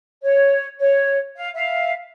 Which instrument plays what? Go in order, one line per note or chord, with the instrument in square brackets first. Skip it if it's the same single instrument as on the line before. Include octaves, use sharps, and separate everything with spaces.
[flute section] C#5
C#5
F5
E5 F5